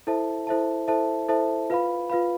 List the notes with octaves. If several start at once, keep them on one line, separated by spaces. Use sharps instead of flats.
E4 A4 C5 E5 A5
E4 A4 C5 E5 A5
E4 A4 C5 E5 A5
E4 A4 C5 E5 A5
F4 B4 F5 B5
F4 B4 F5 B5